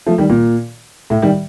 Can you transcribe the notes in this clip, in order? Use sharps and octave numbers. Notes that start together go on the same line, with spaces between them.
F3 A3
D#3 G3
A#2
A2
D#3 G3